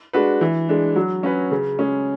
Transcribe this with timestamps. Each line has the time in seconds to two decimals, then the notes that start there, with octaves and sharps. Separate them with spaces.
0.13 G#3 D4 F#4 B4
0.41 E3
0.69 G#3 D4
0.96 F#3
1.23 C#4 F#4 B4
1.51 C#3
1.79 G#3 C#4 G#4